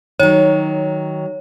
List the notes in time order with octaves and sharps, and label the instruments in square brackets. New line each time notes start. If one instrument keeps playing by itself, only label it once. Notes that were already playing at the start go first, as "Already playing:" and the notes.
[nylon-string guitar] D#3 F#3 [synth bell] C#5